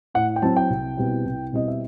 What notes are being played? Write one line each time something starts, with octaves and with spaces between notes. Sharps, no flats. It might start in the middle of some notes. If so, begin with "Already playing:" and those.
A2 F#5
G5
F#3 C4 E4 A5
G5
C2
B2 G3 C4 E4
C2
B2 G3 C4 E4 D#5
E5